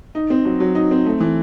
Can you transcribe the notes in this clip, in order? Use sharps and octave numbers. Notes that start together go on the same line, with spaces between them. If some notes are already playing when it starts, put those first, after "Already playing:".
D#4
C4
F#3
F#3
D#4
C4
A3
E3